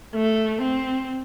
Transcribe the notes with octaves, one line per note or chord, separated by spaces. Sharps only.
A3
C4